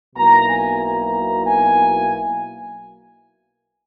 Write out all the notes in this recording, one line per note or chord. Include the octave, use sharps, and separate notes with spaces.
B1 B2 A#3 E4 A#5
G#5
A#5
G#5